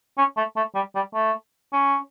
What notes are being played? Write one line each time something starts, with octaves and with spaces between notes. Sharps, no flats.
C#4
A3
A3
G3
G3
A3
C#4